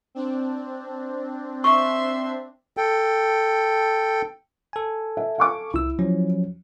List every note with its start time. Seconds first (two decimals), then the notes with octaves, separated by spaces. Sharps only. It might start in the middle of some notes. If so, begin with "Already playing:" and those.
0.15 C4 D4
1.64 E5 C6 C#6
2.77 A4 G5
4.73 A4 G#5
5.17 E5
5.38 F5 C#6 D6
5.74 C2 E4 E6
5.99 F3 F#3 C#4